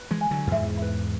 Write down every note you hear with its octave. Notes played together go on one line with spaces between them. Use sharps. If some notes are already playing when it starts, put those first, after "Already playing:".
Already playing: B4
E3 G#3
G#5
D3 F#3
F#2
E2 G#2 E5
B4